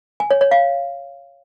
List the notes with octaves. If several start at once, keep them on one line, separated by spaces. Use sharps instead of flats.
G#5
C#5
C#5
F5